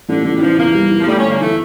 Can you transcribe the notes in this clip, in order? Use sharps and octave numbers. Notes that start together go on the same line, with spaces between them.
A1 D3
A1 D3
G3
E3 F3
E2 A#3
G3
E3
F3
G3 A3
C#4
G1
A#3
E3 A3